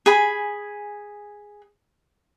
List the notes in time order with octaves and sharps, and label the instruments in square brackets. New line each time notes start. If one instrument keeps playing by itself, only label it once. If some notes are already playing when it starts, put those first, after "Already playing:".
[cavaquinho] G#4 G#5 B5